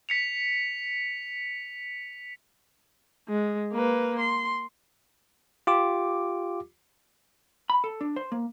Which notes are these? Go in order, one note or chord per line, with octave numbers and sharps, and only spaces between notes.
B6 C#7 F7
G#3
A#3 B4
C6
F4 G4 D6
B5
A4
D4
C5
A#3